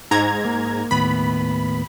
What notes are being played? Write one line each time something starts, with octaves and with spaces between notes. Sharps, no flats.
G#2 A#5 G#6
A#3
D#2 A2 B3 B5